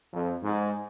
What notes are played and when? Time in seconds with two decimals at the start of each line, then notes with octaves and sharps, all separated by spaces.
0.13 F2
0.43 G#2